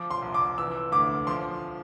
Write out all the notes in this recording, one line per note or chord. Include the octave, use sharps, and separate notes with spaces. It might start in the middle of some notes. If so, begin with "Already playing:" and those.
Already playing: F3 D6
C6
C2
D6
E3 E6
D2 D6
F3 C6